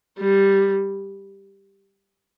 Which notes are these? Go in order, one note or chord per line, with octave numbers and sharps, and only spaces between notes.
G3